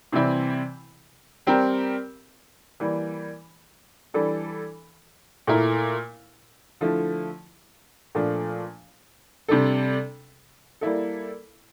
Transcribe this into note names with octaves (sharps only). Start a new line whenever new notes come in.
C3 E3 G3 C4 E4
G3 C4 G4 A#4
E3 G3 A#3
E3 G3 D4 A4
A#2 A3 E4 A#4
D3 F3 A3 E4
A#2 F3 A3 D4
C3 G3 D4 A4
G3 A#3 E4 A4